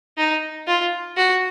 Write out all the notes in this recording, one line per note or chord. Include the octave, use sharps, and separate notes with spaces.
D#4
F4
F#4